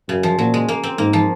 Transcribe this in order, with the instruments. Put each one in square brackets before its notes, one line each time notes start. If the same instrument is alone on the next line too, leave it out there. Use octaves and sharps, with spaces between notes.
[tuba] F#2 [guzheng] C#3
[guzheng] F3
[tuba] A#2 [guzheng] F#3
[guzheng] G#3
A#3
C4
[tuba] G#2 [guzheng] A#3
[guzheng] F3